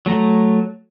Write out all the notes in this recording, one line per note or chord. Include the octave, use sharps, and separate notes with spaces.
F#3 A3 A#5